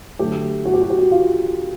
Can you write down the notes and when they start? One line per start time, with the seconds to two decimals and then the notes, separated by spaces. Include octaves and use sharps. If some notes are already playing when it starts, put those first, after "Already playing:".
0.19 D3 F#3 A3 G4
0.65 F#4
0.74 G4
0.82 F#4
0.90 G4
0.99 F#4
1.12 F4